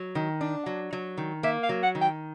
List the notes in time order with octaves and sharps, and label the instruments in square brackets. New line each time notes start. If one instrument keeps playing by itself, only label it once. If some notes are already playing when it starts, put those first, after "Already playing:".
Already playing: [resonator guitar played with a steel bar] F#3
D#3
D4
F#3
F#3
D#3
[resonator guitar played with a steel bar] A#3 [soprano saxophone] E5
[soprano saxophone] F5
[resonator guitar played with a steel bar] F#3
[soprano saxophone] F#5
[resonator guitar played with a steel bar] D#3
[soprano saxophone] G5